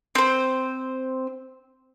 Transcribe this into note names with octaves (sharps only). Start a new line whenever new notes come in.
C4 C5